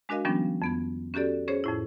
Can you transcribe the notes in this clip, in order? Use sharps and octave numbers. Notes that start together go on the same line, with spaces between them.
G#3 D4 F#4 A#4 D#5 F5
D#3 F3 G3 B3 C#4 D4
F2 B3 G#6
C#4 F#4 G4 A4 D5
C#4 G#4 C5 C#5
F2 A2 E4